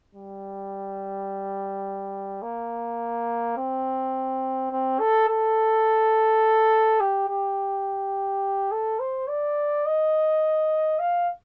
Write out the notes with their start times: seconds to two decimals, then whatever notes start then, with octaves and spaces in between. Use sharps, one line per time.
0.15 G3
2.42 A#3
3.57 C4
4.71 C4
4.99 A4
5.28 A4
7.00 G4
7.29 G4
8.72 A4
8.99 C5
9.28 D5
9.86 D#5
10.99 F5